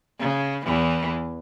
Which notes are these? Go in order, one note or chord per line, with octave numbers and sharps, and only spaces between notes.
C#3
E2 E3